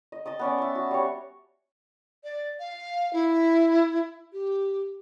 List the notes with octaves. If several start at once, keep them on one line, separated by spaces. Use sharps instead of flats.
D#5
D#5 A5 D#6
B3 C#4 D5
E5 A5
F#4
G3 C#5
D5
F5
E4
G4